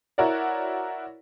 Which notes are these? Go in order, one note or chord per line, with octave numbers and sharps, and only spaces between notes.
E4 F#4 A#4 C#5 D5